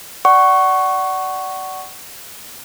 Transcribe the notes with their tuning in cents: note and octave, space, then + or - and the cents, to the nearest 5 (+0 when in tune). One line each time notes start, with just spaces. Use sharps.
D5 +0 F#5 +25 C#6 +0